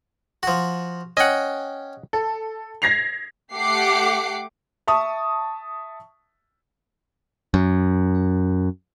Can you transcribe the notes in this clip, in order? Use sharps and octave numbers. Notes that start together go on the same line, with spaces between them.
F3 F#4
C#4 D#5 F#5 G5
A4
G#6 A#6 C7 F7
A3 G4 F#5 D6 C7
E5 A5 C#6 D#6
F#2